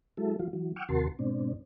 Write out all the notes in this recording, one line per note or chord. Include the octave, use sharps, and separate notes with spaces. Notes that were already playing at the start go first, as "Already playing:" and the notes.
F#3 G#3 E4 A4
F3 F#3 F4
E3 F#3
F#5 G5 C#6 D6 E6 F6
D#2 C3 F#4 A#4 A5 C6
G#2 B2 C4 D4